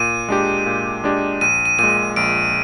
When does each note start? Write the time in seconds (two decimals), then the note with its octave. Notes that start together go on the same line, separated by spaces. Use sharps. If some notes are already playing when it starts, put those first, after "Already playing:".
Already playing: A#2 D#7
0.29 G#3 D4 G4
0.66 A#2
1.04 G#3 D4 G4
1.41 A#1 D#7
1.65 D#7
1.79 A#2 G#3 D#7
2.16 A#1 D7